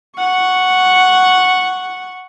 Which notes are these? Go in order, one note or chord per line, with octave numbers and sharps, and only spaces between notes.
F#5 C#6